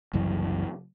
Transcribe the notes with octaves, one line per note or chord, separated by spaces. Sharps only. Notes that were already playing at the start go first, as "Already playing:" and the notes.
F#1 C2 F#2 E3